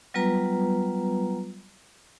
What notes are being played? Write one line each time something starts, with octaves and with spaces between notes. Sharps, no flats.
F#3 G3 B3 F4 B4 A#5